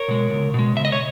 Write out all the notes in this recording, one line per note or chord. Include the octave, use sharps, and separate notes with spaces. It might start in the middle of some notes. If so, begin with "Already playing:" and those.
Already playing: A#4 C#5
B2 G#3
C#2
B2 G#3
C#2 E5
D#5
C#5